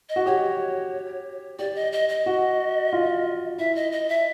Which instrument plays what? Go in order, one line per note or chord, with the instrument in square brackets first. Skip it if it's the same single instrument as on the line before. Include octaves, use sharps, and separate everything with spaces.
[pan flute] D#5
[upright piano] F#4
[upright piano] G4 [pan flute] C#5
[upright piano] G4 [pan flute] D5
[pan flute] D#5
D#5
D#5
[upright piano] F#4
F4
[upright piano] E4 [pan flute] E5
[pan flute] D#5
D#5
E5